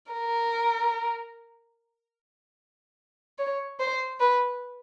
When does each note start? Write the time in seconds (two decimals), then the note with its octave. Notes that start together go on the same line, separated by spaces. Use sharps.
0.12 A#4
3.38 C#5
3.79 C5
4.20 B4